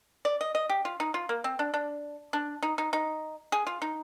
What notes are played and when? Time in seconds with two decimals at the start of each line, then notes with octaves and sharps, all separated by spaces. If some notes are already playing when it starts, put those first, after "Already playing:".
0.25 D5
0.41 D#5
0.55 D#5
0.69 G4
0.85 F4
1.00 D#4
1.14 F4
1.29 A#3
1.44 C4
1.59 D4
1.74 D4
2.33 D4
2.63 D#4
2.78 D#4
2.93 D#4
3.52 G#4
3.67 F4
3.82 D#4